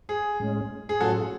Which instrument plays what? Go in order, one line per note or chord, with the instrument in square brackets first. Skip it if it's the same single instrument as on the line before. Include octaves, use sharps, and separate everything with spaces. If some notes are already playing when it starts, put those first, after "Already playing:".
[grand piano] G#4
[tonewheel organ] A2 G#3 C#4
[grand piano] G#4
[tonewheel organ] A2 F#3 C#4 F4 [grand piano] F#4 A4